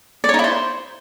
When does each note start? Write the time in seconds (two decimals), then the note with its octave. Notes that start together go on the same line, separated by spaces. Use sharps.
0.24 D5
0.29 C#5
0.34 D#4
0.39 E4
0.44 C5